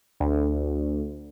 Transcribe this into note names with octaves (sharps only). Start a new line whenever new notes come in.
D2